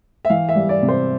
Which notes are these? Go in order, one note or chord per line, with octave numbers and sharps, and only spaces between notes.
E5
E3 F5
E5
G3
D5
C3
C5